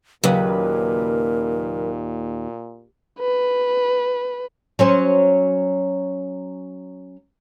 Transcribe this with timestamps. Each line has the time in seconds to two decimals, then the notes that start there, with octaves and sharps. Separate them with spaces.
0.24 D#2 A#2 C#3 F#3 A#4 B4
3.20 B4
4.79 F#3 C#4 C5